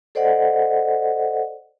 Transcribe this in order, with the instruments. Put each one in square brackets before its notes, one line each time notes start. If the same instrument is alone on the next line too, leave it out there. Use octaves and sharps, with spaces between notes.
[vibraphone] A4 C5 D5 D#5 F#5